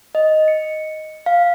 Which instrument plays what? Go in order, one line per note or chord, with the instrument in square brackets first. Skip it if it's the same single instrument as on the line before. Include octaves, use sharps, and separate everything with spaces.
[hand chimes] D#5
C#7
F5